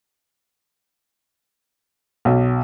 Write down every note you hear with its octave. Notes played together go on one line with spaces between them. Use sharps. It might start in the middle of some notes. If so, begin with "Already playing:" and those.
B1